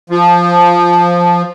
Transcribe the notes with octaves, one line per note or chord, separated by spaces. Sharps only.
F3